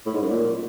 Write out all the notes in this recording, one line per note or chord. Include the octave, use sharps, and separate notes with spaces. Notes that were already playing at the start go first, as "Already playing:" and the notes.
A2
G#2
F#2
A#2